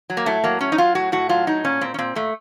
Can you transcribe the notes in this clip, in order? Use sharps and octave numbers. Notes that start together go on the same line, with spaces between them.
F#3
A#3
A2 A3
F#3 A#3
F#3 C#4
D#4
F#3 F4
A2 F#4
A2 F#4
F#3 F4
A2 D#4
A#2 C#4
A#2 C4
C#4
A#2 C4
A#2 A3